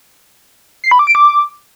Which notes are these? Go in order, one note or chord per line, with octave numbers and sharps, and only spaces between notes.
C7
B5
D6
D7
D6